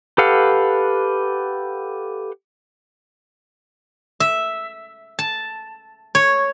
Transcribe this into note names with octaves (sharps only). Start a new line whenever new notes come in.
G4 A4 B4 F5 F#5
E5
A5
C#5